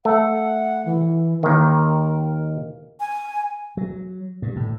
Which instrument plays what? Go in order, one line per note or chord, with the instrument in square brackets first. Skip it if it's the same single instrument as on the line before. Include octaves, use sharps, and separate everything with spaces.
[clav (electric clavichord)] A3 [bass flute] F#5
[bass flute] E3
[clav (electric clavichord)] D#2 D#3 [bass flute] A#4
[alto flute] G#5
[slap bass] F#3
G2
A2